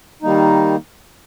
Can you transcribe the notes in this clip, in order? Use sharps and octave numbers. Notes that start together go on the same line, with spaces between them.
D#3 G3 A#3 D#4